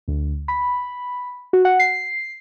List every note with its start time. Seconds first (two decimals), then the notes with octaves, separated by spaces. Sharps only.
0.08 D2
0.48 B5
1.53 F#4
1.65 F#5
1.79 C7